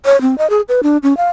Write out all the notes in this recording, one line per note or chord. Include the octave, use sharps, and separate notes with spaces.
C#5
C4
D#5
G#4
B4
D4
C#4
F5